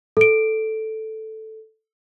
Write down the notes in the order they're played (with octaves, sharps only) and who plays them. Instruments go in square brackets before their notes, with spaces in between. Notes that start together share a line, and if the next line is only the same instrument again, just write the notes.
[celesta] A4 D7